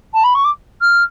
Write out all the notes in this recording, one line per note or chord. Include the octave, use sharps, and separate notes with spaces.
A5
B5
C#6
D6
F6